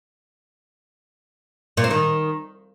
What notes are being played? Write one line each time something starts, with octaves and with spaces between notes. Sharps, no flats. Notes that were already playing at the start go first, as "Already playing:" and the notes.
A#2
C4
D#3